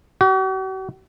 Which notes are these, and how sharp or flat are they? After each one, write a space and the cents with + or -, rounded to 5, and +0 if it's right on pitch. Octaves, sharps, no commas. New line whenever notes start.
F#4 +45